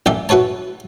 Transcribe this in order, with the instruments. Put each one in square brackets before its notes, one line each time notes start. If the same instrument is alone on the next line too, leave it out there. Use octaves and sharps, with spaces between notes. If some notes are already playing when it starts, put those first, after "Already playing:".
[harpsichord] A1 E3 D5 E5
E4 F#4 B4 C#5 A5